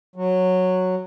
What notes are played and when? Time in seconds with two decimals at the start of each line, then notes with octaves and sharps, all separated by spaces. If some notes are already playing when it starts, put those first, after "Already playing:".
0.16 F#3